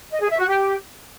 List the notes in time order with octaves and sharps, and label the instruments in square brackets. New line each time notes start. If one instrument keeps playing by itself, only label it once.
[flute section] D#5
G#4
E5
F#4
G4